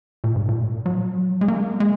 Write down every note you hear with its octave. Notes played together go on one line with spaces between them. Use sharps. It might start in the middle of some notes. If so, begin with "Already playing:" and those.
A#2
G#2
A#2
F#3
G#3
A#3
G#3